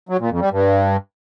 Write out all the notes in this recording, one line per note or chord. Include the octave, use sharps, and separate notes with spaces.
F#3
A#2
F2
G3
G2